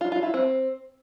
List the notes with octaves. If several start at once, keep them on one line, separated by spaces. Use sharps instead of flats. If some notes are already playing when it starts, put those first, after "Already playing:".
F4
F4
E4
C4